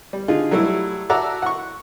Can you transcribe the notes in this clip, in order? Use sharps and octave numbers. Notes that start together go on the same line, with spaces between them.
G3
D3 D#4 F4 G#4
F#3 G3 A3 E4
F#4 A4 D5 E5 F#5 A#5
F#5 C#6